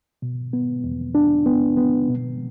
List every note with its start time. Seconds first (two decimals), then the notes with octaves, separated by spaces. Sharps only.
0.22 B2
0.53 B3
0.84 E2
1.15 D4
1.46 B3
1.77 B3
2.08 B2